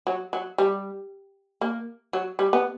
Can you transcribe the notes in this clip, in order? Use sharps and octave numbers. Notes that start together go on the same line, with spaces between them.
F#3
F#3
G3
A#3
F#3
G3
B3